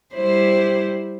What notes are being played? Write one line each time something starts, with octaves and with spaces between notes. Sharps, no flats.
G3 E4 C5